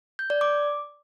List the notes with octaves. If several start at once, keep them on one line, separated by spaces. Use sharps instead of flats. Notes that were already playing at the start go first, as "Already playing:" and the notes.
G6
D5
D6